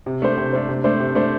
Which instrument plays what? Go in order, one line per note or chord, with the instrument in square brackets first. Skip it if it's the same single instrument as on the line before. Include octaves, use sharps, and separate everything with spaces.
[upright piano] C3
A3 D4 C5
C3
A3 D4 C5
C3
A3 D4 C5
C3
A3 D4 C5